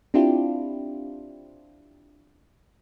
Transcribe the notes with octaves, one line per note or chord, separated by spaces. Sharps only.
C4 D4 E4 F4 G4